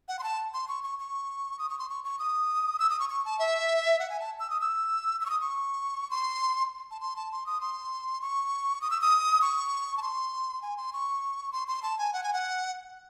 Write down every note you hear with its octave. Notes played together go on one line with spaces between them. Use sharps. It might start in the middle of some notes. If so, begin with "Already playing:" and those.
F#5
C6
A5
C6
C#6
C#6
C#6
D#6
C#6
C6
C#6
C#6
D#6
E6
D#6
C#6
C#6
A5
E5
F#5
G#5
A5
E6
D#6
E6
E6
C#6
D#6
C#6
C6
A5
C6
A5
C6
D#6
C6
C#6
D#6
E6
D#6
C#6
A5
C6
G#5
C6
C#6
C6
C6
A5
G#5
F#5
G#5
F#5